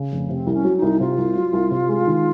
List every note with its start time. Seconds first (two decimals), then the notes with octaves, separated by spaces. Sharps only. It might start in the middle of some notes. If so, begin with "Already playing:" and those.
Already playing: C#3
0.12 F1
0.29 C3 C4
0.47 C2
0.53 C#4
0.65 F#3
0.77 D#4
0.82 C2
1.00 C3 F4
1.18 C2
1.36 F#3
1.53 C2
1.71 C3
1.89 G#3
2.07 D#3